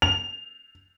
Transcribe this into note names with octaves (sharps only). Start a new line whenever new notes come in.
F7